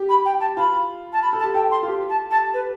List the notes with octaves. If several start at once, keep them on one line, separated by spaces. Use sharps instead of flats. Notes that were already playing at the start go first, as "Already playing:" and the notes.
Already playing: G4
B5
G5
A5
F4 B5
A5
B5
A4
A5
G4
A4 G5
C6
F4
G4
A5
A5
B4